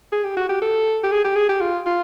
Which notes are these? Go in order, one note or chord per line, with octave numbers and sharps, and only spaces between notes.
G#4
G4
F#4
G4
A4
G4
G#4
G4
G#4
G4
F4
F4